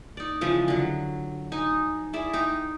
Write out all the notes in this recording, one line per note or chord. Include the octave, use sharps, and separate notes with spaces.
D#4 D5
C#3 E3 F3 G#3
D3 F#3
D#4 G#5
E4 G#4 D5 E5
D#4 G5